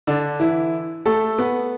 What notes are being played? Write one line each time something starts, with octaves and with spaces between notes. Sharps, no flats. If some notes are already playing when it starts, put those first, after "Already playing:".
D3 D4
E3 E4
A3 A4
B3 B4